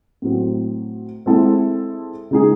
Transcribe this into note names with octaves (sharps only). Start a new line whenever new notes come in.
A2 F#3 C4
G#3 C4 E4 A4
C#3 G#3 D#4 G#4